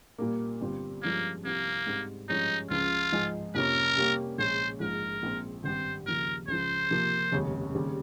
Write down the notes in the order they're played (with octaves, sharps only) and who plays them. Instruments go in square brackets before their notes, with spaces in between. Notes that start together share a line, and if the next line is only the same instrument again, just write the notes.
[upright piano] A#2 G3 A#3
G1 G2 G3 C4 F4
[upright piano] G2 F3 G#3 C#4 [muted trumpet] A#3
[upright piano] C2 C3 F3 C4 [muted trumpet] A#3
[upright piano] G#2 G3 C4
[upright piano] G2 F3 G#3 C#4 G4 [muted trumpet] D#4
[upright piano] C#2 C#3 F3 [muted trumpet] F4
[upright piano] G#2 F3 G#3 D#4 G#4
[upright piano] F2 C3 F3 A#3 C#4 [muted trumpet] A#4
[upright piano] C3 G3 A#3 C#4 G4
[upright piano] A#1 A#2 G#3 C#4 [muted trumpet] C5
[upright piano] A#1 G#2 F3 G#3 [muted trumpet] A#4
[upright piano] A#1 A#2 G#3 C4
[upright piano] G#1 G2 G3 C4 G4 [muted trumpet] C5
[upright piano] D#2 C#3 F3 [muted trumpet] A#4
[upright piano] C#2 C#3 F3 [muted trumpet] C5
[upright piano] C3 F3 A#3
F1 D#2 C#3 G#3 C#4
D#2 C#3 G3 C4